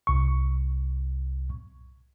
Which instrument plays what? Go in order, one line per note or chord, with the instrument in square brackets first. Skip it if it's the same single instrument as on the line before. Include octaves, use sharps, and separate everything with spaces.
[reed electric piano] C2 C#6